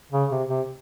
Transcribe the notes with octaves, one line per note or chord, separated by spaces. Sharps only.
C#3
C3
C3